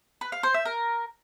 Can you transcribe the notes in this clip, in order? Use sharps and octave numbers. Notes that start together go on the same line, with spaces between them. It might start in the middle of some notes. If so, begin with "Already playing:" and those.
B4
F5
C5
E5
A#4